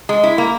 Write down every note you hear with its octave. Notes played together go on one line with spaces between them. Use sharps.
G#3
E4
A#3